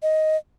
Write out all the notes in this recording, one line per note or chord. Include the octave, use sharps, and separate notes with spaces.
D#5